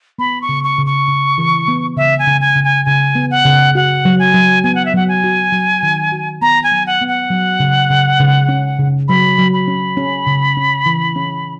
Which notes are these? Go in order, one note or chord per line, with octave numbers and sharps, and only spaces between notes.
B3 B5
C#6
C#3
C#6
C#3
C#6
C#3
E3
B3
C#3 E5
G#5
C#3
G#5
C#3
G#5
C#3 G#5
B3
F#5
C#3
F#4 F#5
F#3
G#5
F#3
B3 G#5
F#5
E5
F#3 F#5
G#5
F#4
F#3
D#3
F#4
B3 A#5
G#5
F#3
F#5
B3
F#5
F#3
C#3
C#3
C#3
C#4
C#3
F#3 B5
F#3
B5
C#4
C#4
C#3
C#4
E3
C#4